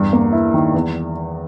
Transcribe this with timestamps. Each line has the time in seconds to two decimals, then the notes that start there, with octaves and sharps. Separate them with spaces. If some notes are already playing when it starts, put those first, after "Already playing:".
Already playing: E2 G2
0.13 A#3
0.32 E4
0.54 D#3
0.74 E2